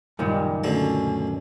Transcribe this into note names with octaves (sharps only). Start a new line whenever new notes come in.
C#2 F#2 A#2 D#3 G3
B2 D3 A3 C#4